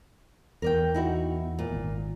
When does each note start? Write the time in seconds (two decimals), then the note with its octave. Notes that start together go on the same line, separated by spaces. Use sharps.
0.62 E2 A#4 D5 G5
0.94 D#4 E4 F#4
1.59 A#2
1.71 G#1